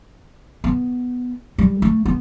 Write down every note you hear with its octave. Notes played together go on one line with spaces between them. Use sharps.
B3
G3
A3
B3